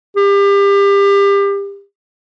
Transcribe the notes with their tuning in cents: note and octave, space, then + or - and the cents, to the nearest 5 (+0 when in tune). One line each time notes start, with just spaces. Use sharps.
G4 +30